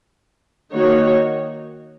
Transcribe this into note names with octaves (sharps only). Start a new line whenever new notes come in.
D#3 A#3 D#4 F#4 C#5